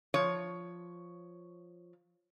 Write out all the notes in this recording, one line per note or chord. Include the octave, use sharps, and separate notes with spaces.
F3 C#5